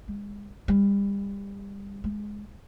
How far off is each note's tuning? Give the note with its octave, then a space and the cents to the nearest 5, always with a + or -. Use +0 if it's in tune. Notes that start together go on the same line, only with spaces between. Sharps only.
G#3 -30
G3 +30
G#3 +0